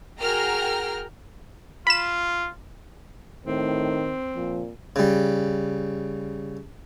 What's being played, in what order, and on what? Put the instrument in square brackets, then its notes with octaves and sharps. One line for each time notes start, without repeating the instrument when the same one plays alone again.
[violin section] F#4 G#4 A#4 G5 A#5 F6
[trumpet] F4 [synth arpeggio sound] B5 E7
[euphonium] A2 [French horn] D#3 [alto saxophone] C4
[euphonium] A#2 [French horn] F3
[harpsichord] C#3 G3